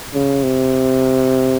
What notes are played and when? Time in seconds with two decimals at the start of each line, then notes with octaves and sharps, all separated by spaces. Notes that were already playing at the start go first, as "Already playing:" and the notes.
0.14 C#3
0.43 C3